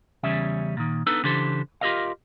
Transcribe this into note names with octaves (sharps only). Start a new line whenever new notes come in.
E2 C#3 G3 C#4 E5
A#2 D#3
B3 D4 D#4 A4 B4
C#3 E3 D4 G4 A4 C5
F4 G4 A4 A#4 D#5 F5